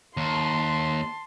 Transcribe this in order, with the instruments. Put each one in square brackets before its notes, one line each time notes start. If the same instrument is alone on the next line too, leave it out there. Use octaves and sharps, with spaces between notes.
[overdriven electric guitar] D#2 [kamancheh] A5 C6